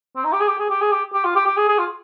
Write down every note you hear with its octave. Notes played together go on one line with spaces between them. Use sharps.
C4
D#4
G4
G#4
G4
G#4
G4
G#4
G4
G4
F4
G4
G4
G#4
G#4
F4